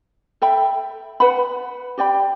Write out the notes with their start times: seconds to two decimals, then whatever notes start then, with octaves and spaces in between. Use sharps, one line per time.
0.42 A4 E5 G5 B5
1.20 B4 F#5 B5
1.98 G4 D5 G5 B5